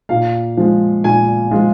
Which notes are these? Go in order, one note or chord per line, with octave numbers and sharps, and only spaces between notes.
A#2 F5
F3 G#3
A#2 G#5
F3 G#3 F4